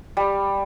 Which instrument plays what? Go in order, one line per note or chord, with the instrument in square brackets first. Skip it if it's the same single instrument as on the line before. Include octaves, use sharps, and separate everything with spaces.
[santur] G3